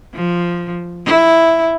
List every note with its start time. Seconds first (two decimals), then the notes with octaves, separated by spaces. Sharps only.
0.14 F3
1.06 E4